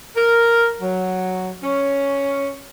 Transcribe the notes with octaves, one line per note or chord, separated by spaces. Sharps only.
A#4
F#3
C#4